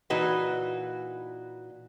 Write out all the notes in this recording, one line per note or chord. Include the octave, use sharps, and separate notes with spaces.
A#2 E3 D#4 F#4 B4